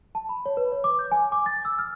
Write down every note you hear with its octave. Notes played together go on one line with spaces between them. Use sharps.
A5
B5
C#5
B4
C#5
D6
G6
G#5
D6
A6
E6
F6